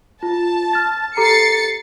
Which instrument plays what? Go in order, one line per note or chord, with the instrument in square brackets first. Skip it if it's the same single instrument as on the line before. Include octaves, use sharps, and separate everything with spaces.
[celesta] F4 [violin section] A5
[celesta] F6 A6
[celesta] G4 A4 A#5 [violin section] A6 C7 C#7